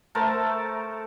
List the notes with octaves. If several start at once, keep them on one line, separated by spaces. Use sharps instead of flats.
A3 A#4 C5 A5